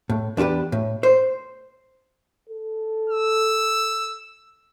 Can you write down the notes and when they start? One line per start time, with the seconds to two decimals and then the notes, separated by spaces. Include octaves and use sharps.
0.09 A2
0.37 E2 D4 F4 G4 B4
0.72 A2
1.03 C5
2.49 A4
3.10 E6